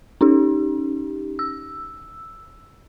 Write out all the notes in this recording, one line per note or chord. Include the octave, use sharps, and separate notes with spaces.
C#4 D#4 G4
E6